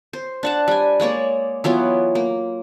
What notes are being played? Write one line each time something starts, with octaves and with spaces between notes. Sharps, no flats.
C5
D4 F#5 A5
G3 G#5
G#3 A#3 C#5 D5
E3 F#3 B3 F4
A#3